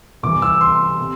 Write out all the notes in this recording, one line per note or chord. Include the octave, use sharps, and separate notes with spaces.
C2 C3 E3 D6
E6
C6
C3